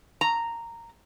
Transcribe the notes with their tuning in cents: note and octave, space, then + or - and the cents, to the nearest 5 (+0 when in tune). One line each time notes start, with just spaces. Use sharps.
A#5 -10